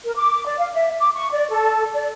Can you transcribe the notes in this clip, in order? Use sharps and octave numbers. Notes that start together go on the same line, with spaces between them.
A#4
D6
D5
F5
E5
D6
C#6
D5
A4
D5